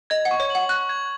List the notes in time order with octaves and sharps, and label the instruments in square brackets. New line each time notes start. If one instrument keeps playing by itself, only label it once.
[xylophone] D#5 [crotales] G#6
[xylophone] F#5
[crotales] C#6
[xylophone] C#5
[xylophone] F#5 [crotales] F#7
[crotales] C#6 [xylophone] F#6
[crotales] G#6